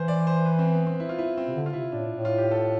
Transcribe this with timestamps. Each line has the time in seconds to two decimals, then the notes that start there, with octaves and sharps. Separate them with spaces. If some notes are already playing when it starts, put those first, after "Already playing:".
Already playing: E3 B4 C5
0.08 D5
0.27 C5
0.45 B4
0.59 C4
0.73 B3
0.87 C4
1.00 E4
1.09 F4
1.19 E4
1.37 C4
1.48 C3
1.55 D3
1.66 F4
1.73 C3 E4
1.92 A2 D4
2.11 A2
2.25 F4
2.38 G4
2.51 A4